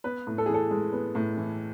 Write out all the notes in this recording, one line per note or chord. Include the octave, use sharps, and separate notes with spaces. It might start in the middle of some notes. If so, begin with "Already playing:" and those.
B3 B4
A2
A4
G#4
E3 A4
G#3
B3
A2
E3